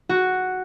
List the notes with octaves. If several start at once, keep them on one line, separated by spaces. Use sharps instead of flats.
F#4